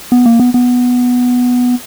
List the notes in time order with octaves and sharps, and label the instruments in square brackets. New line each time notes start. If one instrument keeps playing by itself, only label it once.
[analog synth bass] B3
A#3
B3
B3